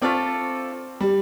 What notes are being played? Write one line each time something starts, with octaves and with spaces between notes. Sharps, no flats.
A3 C4 F4 A4 D5
G3